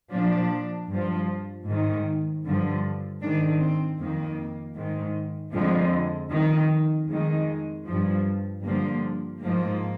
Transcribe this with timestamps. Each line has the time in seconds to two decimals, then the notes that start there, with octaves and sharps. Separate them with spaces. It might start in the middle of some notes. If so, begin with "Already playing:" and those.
0.12 A#2 F3 D4
0.90 G2 F3
1.66 G#2 D#3
2.45 G2 D3 F3
3.22 G#2 D#3 D4
3.60 C4
3.99 F2 D#3 A#3
4.76 G#2 D#3
5.53 F2 D3 F3 G#3
6.31 F2 D#3
7.08 F2 D#3 G#3
7.85 G2 F3
8.63 G2 D3 F3 A#3
9.40 G#2 F3 A#3